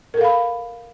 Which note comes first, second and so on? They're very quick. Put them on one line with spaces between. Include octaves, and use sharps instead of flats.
A#4 A4 F5 B5